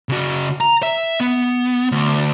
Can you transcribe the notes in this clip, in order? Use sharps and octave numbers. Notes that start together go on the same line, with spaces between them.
C#3 F#4
A#5
E5
B3
D2